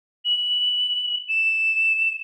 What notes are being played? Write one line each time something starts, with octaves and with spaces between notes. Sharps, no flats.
F#7
E7